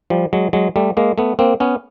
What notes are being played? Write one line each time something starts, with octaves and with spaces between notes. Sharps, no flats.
F3 G3
F#3 G#3
F#3 G#3
G3 A3
G#3 A#3
A3 B3
A#3 C4
B3 C#4